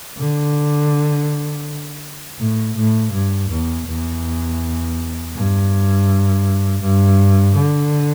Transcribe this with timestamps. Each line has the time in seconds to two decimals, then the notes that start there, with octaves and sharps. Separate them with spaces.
0.18 D3
2.39 A2
2.76 A2
3.12 G2
3.50 E2
3.87 E2
5.34 G2
6.81 G2
7.56 D3